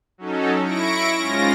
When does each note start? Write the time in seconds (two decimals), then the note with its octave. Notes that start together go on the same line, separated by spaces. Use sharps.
0.18 F#3 C#4 D#4 A4
0.64 E4 C#6 A#6 D7
1.18 G#2 C#4 F4 A#6